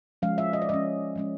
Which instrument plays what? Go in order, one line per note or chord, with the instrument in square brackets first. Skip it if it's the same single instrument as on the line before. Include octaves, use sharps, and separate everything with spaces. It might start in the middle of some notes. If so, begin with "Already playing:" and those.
[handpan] F3 G#3 C#4 F5
E5
D#5
D5
F3 G#3 C#4 D#5
F3 G#3 C#4